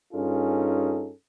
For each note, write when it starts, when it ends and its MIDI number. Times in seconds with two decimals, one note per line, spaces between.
0.13 1.11 43
0.13 1.11 61
0.13 1.11 63
0.13 1.11 65
0.13 1.11 68
0.13 1.11 69